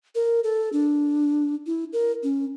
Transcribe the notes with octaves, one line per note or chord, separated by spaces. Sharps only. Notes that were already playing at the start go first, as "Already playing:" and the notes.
A#4
A4
D4
E4
A#4
C#4